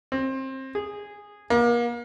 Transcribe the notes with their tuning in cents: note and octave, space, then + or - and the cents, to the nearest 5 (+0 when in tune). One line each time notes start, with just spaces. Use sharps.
C4 +25
G#4 -10
A#3 +35